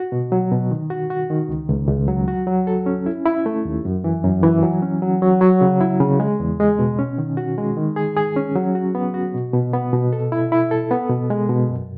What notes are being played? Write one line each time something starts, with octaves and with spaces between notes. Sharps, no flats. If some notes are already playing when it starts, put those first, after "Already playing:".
Already playing: F#4
B2
F#3
B2
D#3
F#4
F#4
D#3
C#2
C#2
C#2
F#3
F#4
F#3
A4
C#4
E4
E4
A3
D#2
F#2
E3
F#2
E3
F#3
C#4
F#3
F#3
F#3
C#3
E4
C#3
G#3
E2
G#3
B2
C#4
D#3
F#4
G#3
D#3
G#4
G#4
C#4
F#3
F#4
B3
F#4
B2
B2
B3
B2
A4
E4
E4
A4
B3
B2
G#3
B2
F#2